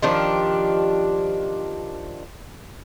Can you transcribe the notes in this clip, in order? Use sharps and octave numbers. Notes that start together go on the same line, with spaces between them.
D#3 F3 D4 G4